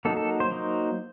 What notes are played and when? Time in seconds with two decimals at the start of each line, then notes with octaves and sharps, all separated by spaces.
0.05 F#3 A#3 D#4 A4
0.17 A4
0.40 C5
0.51 F#3 A#3 D#4